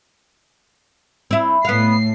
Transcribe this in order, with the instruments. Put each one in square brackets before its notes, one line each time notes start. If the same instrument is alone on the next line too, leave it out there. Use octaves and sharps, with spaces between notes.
[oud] C4 E4
[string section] A2 C7 [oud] B3 F5